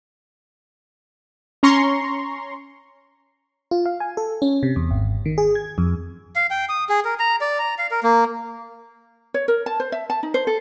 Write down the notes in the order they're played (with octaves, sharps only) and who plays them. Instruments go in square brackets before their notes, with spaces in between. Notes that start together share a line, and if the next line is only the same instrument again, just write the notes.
[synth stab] C#4 A#5 C6 C#6
[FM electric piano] F4
F5
G#5
A4
C#4
C3
E2
G#1
D#3
G#4
G#6
F2
[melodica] F5
G5
D#6
G#4
A#4
A#5
D5
A#5
F5
A#4
A#3
[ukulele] C#5
A#4
A5
C5
E5
A5
D#4
C5
A4